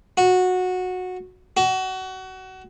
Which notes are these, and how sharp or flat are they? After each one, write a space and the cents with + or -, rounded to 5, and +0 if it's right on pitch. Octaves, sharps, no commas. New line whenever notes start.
F#4 -15
F#4 +25